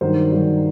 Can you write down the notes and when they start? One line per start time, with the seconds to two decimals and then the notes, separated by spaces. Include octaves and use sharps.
0.01 G2 D#3 F#3 C5
0.31 G2 D#3 F#3